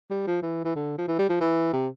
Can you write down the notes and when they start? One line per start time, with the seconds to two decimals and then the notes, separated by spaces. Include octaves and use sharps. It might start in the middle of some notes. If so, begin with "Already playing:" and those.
0.11 G3
0.27 F3
0.42 E3
0.65 E3
0.75 D3
0.98 F3
1.08 E3
1.19 G3
1.29 F3
1.40 E3
1.73 C3